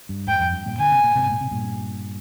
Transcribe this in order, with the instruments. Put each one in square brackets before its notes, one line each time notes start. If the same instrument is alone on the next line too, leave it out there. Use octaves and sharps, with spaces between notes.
[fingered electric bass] G2
[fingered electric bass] F2 G#2 [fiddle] G5
[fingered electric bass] F2
G2
G2 A#2
[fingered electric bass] D3 [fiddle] G#5
[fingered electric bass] C3
A#2
G#2 C3
A#2
C3
G2 A#2